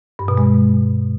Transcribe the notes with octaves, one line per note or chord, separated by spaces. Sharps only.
G2
B2
G#3